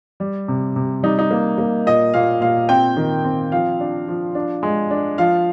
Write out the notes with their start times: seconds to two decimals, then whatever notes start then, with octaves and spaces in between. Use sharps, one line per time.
0.20 G3
0.48 C3
0.76 C3
1.03 G3 D#4
1.19 D#4
1.31 A#3
1.58 A#3
1.86 A#2 D#5
2.14 A#2 F5
2.41 A#2 F5
2.69 C4 G5
2.97 D#3
3.25 C4
3.52 F3 F5
3.80 D4
4.08 F3
4.35 D4
4.63 G#3
4.91 D4
5.18 F3 F5